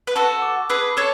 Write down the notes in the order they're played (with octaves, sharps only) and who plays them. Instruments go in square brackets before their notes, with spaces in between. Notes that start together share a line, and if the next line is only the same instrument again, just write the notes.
[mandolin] B4
[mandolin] F#4 A4 [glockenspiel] A5
[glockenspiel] D6
[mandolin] G#4 B4 [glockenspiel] E6
[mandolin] A4 C#5 [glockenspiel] A6